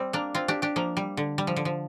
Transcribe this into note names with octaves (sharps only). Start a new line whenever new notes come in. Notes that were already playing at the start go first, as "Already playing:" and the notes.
Already playing: G3 C4
A#3 D4
C4 F4
D4 G4
D4 G4
F3 A#3
G3
D3
G3
F3
D3
F3